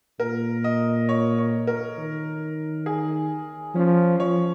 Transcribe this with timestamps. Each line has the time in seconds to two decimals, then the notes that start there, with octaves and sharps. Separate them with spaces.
0.20 A#2 A#4
0.64 D#5
1.09 C#5
1.38 C#5
1.67 A#4
1.98 D#3
2.86 G#4
3.75 F3 C#4
4.20 F3 C#5